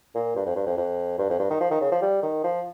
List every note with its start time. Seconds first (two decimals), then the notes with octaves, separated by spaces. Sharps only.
0.15 A#2
0.36 G2
0.46 F2
0.56 G2
0.66 F2
0.77 F2
1.18 G2
1.30 F2
1.39 G2
1.50 D#3
1.60 F3
1.71 D#3
1.81 C#3
1.92 F3
2.02 G3
2.23 D#3
2.44 F3